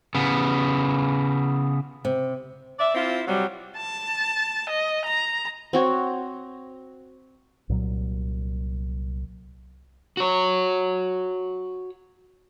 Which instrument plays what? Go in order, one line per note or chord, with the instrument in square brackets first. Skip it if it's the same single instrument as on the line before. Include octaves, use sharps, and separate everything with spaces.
[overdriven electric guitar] C#3 B3
[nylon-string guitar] C3
[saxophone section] D5 E5
C4 E4 F4
C3 F#3 G3
[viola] A5
D#5
A#5
[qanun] C4 F#4 C#5
[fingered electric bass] C2 A#2 F#3
[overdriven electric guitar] F#4 C#5